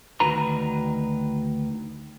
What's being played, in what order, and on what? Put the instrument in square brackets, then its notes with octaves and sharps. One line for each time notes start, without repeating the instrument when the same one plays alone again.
[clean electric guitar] D2 D#3 F#4 B4 A#5